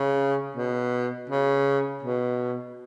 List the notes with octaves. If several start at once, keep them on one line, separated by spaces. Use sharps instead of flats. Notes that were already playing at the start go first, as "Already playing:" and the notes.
Already playing: C#3
B2
C#3
B2